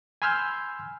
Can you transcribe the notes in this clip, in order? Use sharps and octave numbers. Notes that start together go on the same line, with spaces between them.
G#5 B5 C6 E6 F6 G6